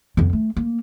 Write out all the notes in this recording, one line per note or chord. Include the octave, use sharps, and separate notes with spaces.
F2 B3
A3
A#3